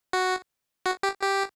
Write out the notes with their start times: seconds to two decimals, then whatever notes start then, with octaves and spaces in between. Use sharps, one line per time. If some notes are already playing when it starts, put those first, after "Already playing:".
0.13 F#4
0.86 F#4
1.03 G4
1.21 G4